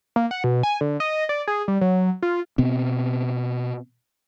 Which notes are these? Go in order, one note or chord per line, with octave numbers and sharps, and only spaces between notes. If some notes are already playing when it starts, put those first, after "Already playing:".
A#3
F#5
B2
G#5
D3
D#5
D5
G#4
G3
F#3
F4
B2 B3 C4